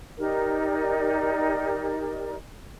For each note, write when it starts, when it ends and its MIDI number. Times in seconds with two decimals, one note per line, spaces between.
0.18 2.35 63
0.18 2.35 67
0.18 2.35 70
0.18 2.35 74